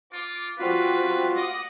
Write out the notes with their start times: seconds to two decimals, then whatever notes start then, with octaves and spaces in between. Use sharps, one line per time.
0.13 F4 D6
0.59 F3 G3 C4 F4 F#4 B4 F5
1.36 D#5 F#5 D6 D#6